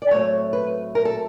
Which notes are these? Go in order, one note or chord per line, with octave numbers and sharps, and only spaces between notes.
D5
A2 F#3 A3 C4 C#5
B4
A#4
A4